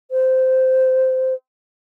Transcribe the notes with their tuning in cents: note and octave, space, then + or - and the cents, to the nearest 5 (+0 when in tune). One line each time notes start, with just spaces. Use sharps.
C5 -10